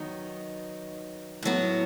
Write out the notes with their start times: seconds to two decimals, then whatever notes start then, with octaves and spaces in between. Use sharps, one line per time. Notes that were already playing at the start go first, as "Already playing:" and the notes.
Already playing: D#3 F#3 B3 D#4
1.43 A2 F#3 B3